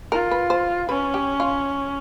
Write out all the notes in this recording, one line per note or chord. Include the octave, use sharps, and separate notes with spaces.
F4 A#4
B4
C5
C#4 B4
G4
F4